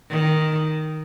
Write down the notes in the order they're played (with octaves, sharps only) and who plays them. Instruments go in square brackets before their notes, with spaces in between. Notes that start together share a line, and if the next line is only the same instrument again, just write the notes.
[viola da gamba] D#3